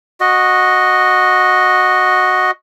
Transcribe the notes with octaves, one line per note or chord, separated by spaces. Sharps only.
F#4 D#5